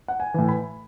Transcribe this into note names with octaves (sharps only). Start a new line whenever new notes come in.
F#5
G#5
A2 E3
B5